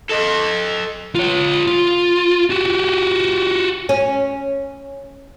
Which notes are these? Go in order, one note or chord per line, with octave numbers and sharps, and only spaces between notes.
A4 D#5
F4 C#5
F4
F#4 G4
C#4